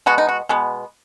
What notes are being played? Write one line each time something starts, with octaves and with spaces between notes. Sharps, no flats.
B2 G#3 B3 F#4
D#4
F#4
B2 G#3 B3